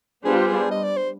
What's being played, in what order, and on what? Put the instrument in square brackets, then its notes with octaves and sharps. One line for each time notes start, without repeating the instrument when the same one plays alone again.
[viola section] G3 B3 D4 F4 C5 [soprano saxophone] G#4
[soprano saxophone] G4
G#4
D#5
D5
C5